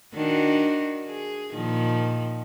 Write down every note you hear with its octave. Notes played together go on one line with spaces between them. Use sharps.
D#3 D4 F#4
G#4
A#2 D#3 F3